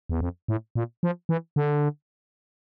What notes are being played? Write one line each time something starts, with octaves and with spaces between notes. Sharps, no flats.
E2
F2
A2
A#2
F3
E3
D3